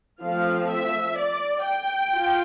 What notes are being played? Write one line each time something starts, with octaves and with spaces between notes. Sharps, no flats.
F3 A3 C4 F5
E5
D5
G5
F4